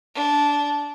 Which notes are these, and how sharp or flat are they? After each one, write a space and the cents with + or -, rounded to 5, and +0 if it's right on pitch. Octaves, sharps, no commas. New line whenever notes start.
D4 -15